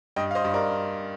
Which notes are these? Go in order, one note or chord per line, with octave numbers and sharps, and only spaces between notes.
G2 D#5 G5
F5
C5 D#5
G2
A#4 D5